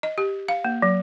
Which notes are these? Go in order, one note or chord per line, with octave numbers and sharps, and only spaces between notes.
D#5
G4
F5
A#3
F#3